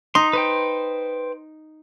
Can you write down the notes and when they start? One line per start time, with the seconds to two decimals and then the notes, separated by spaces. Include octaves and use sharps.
0.15 D#4 C6
0.33 B4 C5 G5